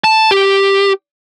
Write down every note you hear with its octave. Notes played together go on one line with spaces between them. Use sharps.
A5
G4